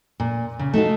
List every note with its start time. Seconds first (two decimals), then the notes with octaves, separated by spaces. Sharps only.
0.20 A#2
0.59 C#3
0.73 A3 D#4 F#4 F5